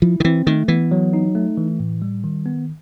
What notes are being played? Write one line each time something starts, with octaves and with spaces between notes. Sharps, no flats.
F3 E4
D#3
E3 C4
D#3 A3
E3 B3
F#3
D#4
A3
E3
A2
G3
D#3
B3